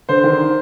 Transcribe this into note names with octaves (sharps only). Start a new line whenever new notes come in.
D3 C5
D#3